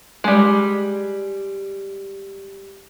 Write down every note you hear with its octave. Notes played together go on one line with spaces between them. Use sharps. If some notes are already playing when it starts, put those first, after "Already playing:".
G3 G#3